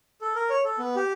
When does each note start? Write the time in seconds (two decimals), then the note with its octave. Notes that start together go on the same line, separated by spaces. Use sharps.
0.21 A4
0.35 A#4
0.50 C#5
0.65 A4
0.79 B3
0.96 G4